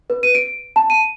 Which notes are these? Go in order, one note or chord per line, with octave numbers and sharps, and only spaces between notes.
B4
D#7
D7
A5
D#7